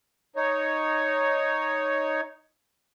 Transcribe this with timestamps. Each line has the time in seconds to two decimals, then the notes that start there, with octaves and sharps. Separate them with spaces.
0.36 D#4 C#5